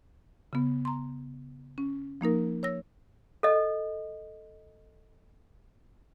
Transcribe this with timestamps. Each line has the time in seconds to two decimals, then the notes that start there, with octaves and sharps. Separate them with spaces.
0.53 C#3 B3
0.85 A#5 C6
1.78 C#4
2.21 F3 A#3 D#4 A#4
2.63 C#5 E6 A#6
3.43 A4 D#5